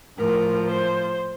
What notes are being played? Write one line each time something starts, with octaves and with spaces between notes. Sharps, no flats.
A2 F3 A#4
C5